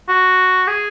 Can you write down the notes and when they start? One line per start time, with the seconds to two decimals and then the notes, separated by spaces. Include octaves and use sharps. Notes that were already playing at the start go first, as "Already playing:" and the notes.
0.09 F#4
0.68 G#4